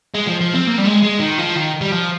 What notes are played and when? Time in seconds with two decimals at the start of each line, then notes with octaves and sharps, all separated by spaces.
0.15 G#3
0.27 F3
0.41 F3
0.54 C4
0.67 A#3
0.78 G3
0.86 G#3
1.03 G#3
1.20 D#3
1.39 F3
1.56 D#3
1.81 G3
1.92 F3